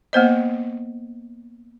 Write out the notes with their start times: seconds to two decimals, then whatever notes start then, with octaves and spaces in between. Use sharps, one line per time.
0.13 A#3 B3 C5 D#5